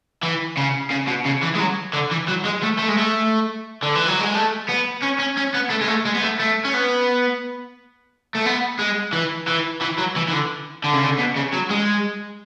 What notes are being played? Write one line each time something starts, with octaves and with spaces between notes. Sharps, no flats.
E3
C#3
C#3
B2
C#3
E3
G#3
F#3
D3
E3
F#3
G#3
A3
A3
G#3
A3
D3
E3
F#3
G#3
A3
B3
C#4
C#4
C#4
B3
A3
G#3
A3
G#3
B3
A3
A3
C#4
B3
A3
B3
G#3
E3
E3
E3
F#3
E3
E3
D3
D3
C#3
D3
B2
C#3
F#3
G#3